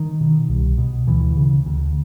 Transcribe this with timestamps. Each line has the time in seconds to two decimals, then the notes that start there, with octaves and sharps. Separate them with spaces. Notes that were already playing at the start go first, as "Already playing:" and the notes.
Already playing: D#3
0.20 B2
0.49 C2
0.78 B2
1.07 D2 E3
1.37 C#3
1.66 D2